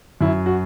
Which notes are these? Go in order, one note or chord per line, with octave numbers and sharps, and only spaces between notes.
F#2 E4
F#4